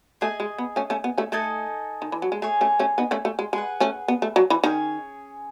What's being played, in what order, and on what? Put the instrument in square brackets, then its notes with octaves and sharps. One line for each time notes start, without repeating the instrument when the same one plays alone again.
[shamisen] A3 [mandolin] G#4 D#5 G#5
[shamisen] G#3
B3
A3 C#4
A3 C#4
B3
A3 C#4
[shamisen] A3 [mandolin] D#4 A4 D#5 G#5
[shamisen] D#3
E3
F#3
G#3
[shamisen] A3 [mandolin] G#4 C#5 G#5
[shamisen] A3 C#4
A3 C#4
B3 D#4
A3 C#4
A3
G#3
[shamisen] G#3 [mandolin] G#4 B4 F#5
[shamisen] A3 C#4
B3
A3
F#3
E3
[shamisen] D#3 [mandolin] C#4 G#4 C#5